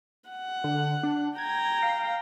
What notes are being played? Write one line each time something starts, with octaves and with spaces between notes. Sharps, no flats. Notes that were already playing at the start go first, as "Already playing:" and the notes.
F#5
D3
D4
G5 A#5 G#6
F5